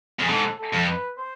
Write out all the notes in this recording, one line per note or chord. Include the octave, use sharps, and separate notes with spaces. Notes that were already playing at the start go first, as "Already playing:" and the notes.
F2 G#4
G#2 A4
A4
F2
B4
C5